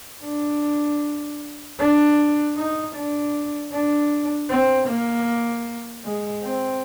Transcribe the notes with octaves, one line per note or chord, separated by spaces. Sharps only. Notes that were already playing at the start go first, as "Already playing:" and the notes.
D4
D4
D#4
D4
D4
C4
A#3
G#3
C4